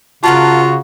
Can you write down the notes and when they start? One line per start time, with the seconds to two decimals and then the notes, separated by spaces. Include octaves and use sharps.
0.23 C#3 F4 F#4 A#4 F#5 A5